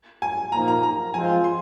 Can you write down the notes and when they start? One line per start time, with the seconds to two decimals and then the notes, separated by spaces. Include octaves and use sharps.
0.22 G#5
0.52 A#2 F3 A#3 D#4 A#5
0.68 A#5
0.83 A#5
1.14 F3 G#3 C4 F4 G#5
1.44 C6